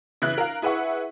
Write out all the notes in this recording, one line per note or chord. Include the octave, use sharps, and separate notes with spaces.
C#3 E3 E4 F#6
A#4 F5
E4 G#4 B4 E5 F#5 C#6